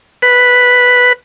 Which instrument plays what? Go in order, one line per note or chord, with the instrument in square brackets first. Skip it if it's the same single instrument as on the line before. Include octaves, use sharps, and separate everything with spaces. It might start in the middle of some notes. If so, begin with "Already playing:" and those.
[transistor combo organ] B4